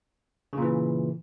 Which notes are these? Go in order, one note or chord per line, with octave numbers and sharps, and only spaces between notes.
A#2 C#3 E3